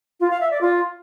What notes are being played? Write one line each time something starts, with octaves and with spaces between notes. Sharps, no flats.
F4
F5
E5
D5
F4